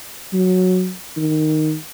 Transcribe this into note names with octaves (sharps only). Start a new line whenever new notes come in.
F#3
D#3